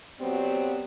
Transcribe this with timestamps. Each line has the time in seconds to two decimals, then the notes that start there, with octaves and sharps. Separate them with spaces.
0.20 F#3 B3 C4 G4 D5